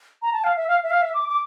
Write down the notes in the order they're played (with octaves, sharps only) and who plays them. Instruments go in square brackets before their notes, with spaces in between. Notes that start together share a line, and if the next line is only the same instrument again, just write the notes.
[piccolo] A#5
A5
F5
E5
F5
E5
F5
E5
D6
D6